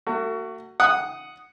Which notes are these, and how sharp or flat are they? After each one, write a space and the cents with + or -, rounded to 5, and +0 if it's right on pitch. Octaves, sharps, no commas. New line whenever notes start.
A3 +45 F#4 +20
F#5 +0 D#6 +0